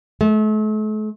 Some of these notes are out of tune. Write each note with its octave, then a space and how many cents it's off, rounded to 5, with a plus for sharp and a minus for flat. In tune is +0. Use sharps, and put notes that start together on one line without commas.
A3 -40